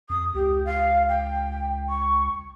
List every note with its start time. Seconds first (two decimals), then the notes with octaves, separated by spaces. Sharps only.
0.10 F2 D#6
0.35 C#2 G4
0.65 F5
1.09 G5
1.89 C#6